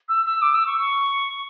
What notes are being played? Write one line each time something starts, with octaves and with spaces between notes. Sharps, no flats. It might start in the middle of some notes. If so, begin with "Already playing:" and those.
E6
E6
D6
E6
C#6
C#6